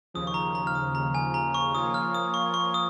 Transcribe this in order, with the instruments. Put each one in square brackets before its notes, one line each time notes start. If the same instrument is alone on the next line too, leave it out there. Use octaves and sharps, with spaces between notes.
[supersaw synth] D#2 C#3 F3 [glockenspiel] D#6
[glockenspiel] C#6
A#5
A#5
F6
D#6
A#5
G#5
A#5
C#6
[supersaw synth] F3 A#3 F4 C#5 [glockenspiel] D#6
[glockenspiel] F6
D#6
C#6
C#6
D#6